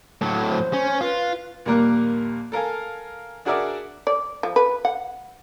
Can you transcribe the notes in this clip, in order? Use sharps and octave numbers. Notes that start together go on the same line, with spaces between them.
A2 F#3
C5
C#4
F4 B4
A#1 D#2 G3 A#3 A#4 F#6
A4 A#4 F5 G#5
D4 F#4 G#4 A#4 D5 E5
D5
F3
B4
F#5